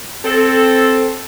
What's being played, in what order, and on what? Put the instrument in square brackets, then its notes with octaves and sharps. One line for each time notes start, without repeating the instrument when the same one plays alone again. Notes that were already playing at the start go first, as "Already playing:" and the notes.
[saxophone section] C4 A4